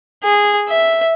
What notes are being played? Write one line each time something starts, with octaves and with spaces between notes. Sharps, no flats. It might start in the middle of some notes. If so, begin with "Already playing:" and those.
G#4
E5